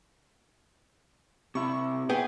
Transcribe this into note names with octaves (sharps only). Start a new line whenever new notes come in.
C3 E4 C#6
B3 G#4 B4 G5